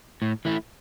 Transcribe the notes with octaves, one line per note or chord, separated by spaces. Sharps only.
A2
E3 A3 E4